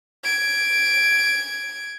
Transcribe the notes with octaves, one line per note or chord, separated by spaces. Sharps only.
G#6 D7